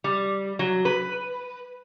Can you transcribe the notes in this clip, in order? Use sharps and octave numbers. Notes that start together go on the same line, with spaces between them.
G3
F#3
B4